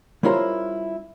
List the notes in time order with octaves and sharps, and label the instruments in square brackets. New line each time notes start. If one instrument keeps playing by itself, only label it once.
[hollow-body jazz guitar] G3 C#4 E4 F4 A#4 C5